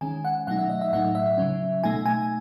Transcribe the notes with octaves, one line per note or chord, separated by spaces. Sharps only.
D#3 G#3 C#4 G#5
F#5
B2 F#3 A3 D#4 F#5
E5
D#5
E5
A2 F#3 A3 D#4 F#5
E5
C#3 F#3 C#4
B2 A3 D#4 G#5
G#5